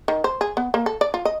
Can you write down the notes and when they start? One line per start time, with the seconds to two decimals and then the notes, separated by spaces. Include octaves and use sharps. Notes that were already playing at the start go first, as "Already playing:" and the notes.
0.08 D#3
0.24 C5
0.41 G#4
0.57 B3
0.74 A#3
0.86 A4
1.01 D5
1.14 F4
1.25 D#5